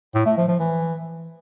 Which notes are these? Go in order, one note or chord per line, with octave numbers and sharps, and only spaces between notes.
A2
A3
F3
F3
E3